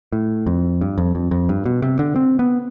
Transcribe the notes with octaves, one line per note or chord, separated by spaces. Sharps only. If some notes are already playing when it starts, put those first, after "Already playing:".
A2
F2
G2
F2
F2
F2
G2
B2
C3
D3
C4
B3